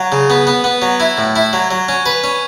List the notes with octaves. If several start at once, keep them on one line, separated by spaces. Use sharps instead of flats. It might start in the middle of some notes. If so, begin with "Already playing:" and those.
Already playing: F#3
C#3
B3
B3
B3
F#3
E4
A2
E4
F#3
F#3
C#4
B4
C#4